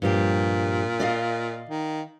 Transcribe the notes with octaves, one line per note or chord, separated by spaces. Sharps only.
G2 A#2 F3 G4
D5 D#5 F5
D#3